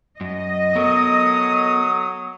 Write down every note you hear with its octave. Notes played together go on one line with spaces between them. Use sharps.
F#2 D#5
F#3 B3 A4 A#4 D#6